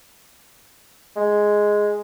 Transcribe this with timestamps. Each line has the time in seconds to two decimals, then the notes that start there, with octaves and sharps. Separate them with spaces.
1.17 G#3